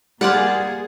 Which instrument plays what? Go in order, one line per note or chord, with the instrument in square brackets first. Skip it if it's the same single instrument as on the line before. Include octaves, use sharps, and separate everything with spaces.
[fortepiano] G3 [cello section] A#3 G#4 [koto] F4 D5 F#5